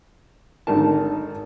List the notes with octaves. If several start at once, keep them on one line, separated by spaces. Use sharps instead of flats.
G#1 D3 D#4 A#4 A5